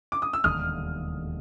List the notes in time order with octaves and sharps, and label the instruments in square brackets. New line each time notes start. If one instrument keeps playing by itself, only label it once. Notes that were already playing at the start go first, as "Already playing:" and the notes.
[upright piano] D6
D#6
E6
[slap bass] E1 D#2 D3 G3 [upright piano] D#6 F6